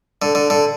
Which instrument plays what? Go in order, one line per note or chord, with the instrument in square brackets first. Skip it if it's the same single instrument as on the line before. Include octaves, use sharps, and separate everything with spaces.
[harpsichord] D3
D3
D3